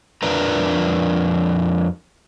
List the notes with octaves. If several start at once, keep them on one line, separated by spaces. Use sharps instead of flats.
F2 F3 D4 A#4 B4 A#5